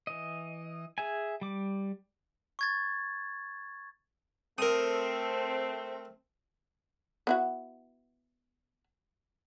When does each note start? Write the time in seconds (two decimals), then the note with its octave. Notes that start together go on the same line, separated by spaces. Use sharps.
0.07 E3 D#5
0.98 G#4 E5 G#5
1.41 G3 D6
2.59 C#6 G#6 A6
4.58 A3 C4 A#4 D#6
7.27 B3 E4 F#4